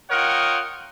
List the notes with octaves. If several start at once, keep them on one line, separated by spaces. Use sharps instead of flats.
F4 A#4 C#5 D#5 F#5 G5